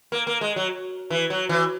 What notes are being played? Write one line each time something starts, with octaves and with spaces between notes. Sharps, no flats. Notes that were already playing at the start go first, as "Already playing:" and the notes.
A#3
A#3
G#3
F#3
E3
F#3
E3